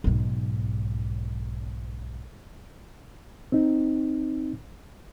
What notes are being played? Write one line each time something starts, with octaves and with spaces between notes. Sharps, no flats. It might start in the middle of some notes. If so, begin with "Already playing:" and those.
B1 G#2
C4 D#4